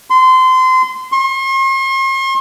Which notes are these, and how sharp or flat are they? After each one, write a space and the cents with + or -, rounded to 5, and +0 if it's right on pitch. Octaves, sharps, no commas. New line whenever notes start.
C6 -25
C6 +45